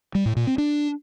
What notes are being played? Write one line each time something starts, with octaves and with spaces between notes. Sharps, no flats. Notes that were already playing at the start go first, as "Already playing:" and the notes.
G3
A2
A#2
C4
D4